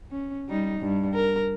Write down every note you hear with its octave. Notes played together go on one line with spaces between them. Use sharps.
C#4
G3 D#4
G2
A#4